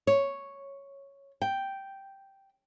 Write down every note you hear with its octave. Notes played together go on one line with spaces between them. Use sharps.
C#5
G5